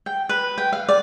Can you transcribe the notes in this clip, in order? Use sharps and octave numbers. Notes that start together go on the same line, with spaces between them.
G5
B4
G5
F5
D5